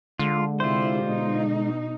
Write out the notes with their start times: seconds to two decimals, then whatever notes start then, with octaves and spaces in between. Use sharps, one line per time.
0.19 D3 G#3 F4
0.60 C3 E4 F4 G4 C5
1.03 B2 D#4